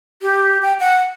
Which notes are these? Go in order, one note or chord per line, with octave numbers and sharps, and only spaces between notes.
G4
G5
F#5